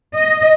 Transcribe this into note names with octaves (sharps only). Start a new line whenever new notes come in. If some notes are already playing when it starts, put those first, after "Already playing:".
D#5